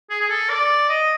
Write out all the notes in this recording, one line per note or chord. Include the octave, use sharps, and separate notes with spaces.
G#4
G#4
A4
D5
D#5